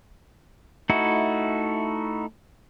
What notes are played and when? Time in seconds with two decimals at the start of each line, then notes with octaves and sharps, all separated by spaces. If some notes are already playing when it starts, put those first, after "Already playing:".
0.90 A3 D#4 E4 F#4